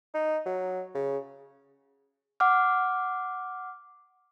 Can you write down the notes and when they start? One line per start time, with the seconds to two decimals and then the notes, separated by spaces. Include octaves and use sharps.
0.14 D#4
0.46 F#3
0.95 C#3
2.40 F#5 D6 F6